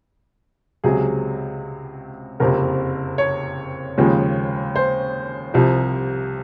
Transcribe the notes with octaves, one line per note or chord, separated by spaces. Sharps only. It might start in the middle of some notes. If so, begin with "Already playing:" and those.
C#2 C3 F#3 G#4
F#1 F2 C3 A#4
C#5
D#2 C#3 F3 G#3
C5
C2 C3 F3